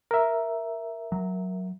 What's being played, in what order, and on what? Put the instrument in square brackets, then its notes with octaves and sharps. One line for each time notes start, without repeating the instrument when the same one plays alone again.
[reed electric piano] A#4 E5
[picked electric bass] F#3